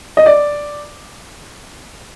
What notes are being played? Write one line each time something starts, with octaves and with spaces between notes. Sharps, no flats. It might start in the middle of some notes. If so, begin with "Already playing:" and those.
D#5
D5